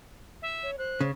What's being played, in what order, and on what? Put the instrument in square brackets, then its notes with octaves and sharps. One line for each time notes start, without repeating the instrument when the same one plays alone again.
[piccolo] E5
[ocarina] C#5
[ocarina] C5 [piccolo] F#6
[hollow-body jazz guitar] C#3